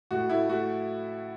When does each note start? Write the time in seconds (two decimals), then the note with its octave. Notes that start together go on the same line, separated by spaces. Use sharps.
0.11 A2 F#4
0.30 A3 E4
0.49 A3 F#4